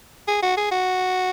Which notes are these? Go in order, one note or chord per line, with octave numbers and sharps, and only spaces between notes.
G#4
F#4
G#4
F#4